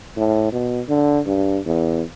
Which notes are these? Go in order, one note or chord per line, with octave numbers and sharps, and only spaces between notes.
A2
B2
D3
G2
E2